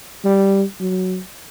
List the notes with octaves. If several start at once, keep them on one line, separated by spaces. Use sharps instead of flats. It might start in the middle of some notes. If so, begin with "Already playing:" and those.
G3
F#3